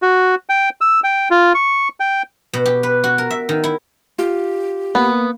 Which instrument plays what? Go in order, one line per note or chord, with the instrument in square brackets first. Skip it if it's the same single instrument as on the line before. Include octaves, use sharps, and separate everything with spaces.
[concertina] F#4
G5
E6
G5
F4
C#6
G5
[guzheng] B2
G4
B4
F#4
A#4
E5
D#3
E4
[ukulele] F4 [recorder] G4
[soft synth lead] A#3 [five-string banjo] B3